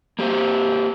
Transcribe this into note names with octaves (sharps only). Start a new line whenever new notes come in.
A#3 G4 C5